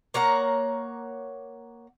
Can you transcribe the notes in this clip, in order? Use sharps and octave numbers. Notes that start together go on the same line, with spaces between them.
A#3 C#5 F#5 A#5